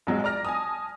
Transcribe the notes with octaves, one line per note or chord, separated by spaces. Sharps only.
A#1 F#3 G#3
D5 A#5 F6 A#6
G#5 A5 D#6